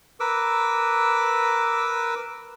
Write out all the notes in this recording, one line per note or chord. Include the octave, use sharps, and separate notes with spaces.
A#4 B4 D6 E6